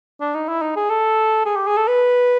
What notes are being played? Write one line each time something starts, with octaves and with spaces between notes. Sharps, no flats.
D4
D#4
E4
D#4
G#4
A4
G#4
G4
G#4
A4
B4